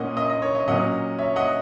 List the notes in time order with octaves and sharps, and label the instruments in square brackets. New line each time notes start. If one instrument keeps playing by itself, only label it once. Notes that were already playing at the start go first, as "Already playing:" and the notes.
Already playing: [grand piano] A#2 A#3 C#4 D#5 F#5
D#5
D#5
C#5
D#5
A#2 F#3 C#4 D#5 F#5
C#5 E5
D#5 F#5